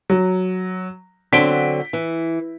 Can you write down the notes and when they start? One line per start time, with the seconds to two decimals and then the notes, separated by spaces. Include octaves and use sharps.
0.10 F#3
1.33 D3 F#3 C4 B6 D7 G7
1.93 E3